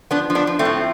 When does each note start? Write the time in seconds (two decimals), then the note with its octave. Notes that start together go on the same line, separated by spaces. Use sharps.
0.11 F3 B3 D4
0.30 F3
0.35 B3 D4
0.47 F3
0.59 A3 C4
0.65 A2